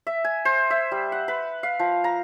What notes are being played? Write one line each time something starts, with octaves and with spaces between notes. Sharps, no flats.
E5
G#5
C5
E5
G3
F#5
B4
F5
F3
A#5